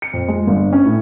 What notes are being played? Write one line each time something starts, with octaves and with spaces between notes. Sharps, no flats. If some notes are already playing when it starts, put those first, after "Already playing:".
C#7
F2
G#3
G1
C#4
A2